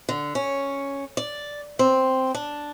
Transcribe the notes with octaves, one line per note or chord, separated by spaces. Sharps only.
D3
C#4
D5
C4
D4